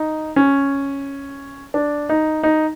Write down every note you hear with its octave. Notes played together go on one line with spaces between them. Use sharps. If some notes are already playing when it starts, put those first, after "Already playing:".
Already playing: D#4
C#4
D4
D#4
D#4